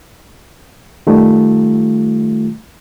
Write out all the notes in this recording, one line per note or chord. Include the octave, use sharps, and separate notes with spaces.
D#3 G3 A3 F4